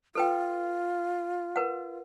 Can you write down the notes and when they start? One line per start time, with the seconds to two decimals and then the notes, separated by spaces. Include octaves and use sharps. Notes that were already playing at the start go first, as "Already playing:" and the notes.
0.15 F4 A4 B4 G5
1.56 A#4 B4 F#5